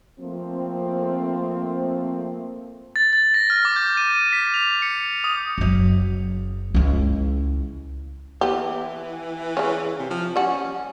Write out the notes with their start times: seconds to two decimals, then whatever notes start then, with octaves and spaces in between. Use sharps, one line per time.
0.20 F3 A3 A#3 C4
2.96 A6
3.13 A6
3.34 A#6
3.50 F6
3.65 D6
3.76 G6
3.97 D#7
4.33 B6
4.54 F7
4.82 C#7
5.24 D#6
5.58 F#1 F#3
6.74 C#2 E4
8.41 E3 B3 G4
9.57 C#3 C#4
9.99 C3
10.10 F3
10.36 G3 C#4 F#4